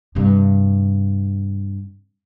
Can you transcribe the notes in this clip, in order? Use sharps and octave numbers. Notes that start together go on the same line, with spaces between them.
G2 C3